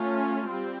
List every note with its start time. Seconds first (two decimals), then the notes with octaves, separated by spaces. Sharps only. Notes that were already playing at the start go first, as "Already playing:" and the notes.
Already playing: A3 C#4 F4
0.49 G3 C4